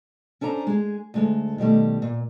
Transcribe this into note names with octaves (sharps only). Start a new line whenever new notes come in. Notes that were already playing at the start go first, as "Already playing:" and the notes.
C#4 D4 A4 C5 A#5
G#3 G#4
D2 G#3 A4
B2 D#3 G3 A3
A#2